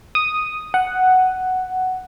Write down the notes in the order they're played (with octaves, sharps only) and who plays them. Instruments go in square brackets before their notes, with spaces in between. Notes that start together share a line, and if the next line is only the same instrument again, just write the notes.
[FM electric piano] D#6
F#5